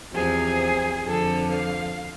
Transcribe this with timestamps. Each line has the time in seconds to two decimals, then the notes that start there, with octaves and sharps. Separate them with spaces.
0.13 E2 C3 F3 G#4
1.05 F2 D3 F3 A4
1.51 F5